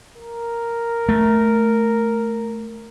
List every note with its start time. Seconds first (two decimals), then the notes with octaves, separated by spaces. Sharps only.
0.16 A#4
1.09 A3